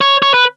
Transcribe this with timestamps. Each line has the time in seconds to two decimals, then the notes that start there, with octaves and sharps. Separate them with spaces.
0.01 C#5
0.22 C#5
0.34 B4